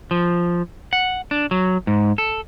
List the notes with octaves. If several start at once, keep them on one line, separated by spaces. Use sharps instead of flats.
F3
F#5
D4
F#3
G#2
A4